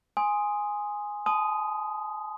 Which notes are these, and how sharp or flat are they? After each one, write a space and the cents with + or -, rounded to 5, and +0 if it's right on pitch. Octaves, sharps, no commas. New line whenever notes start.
G#5 +0 C6 +0 D#6 +0
A5 -40 C6 -45 D#6 +0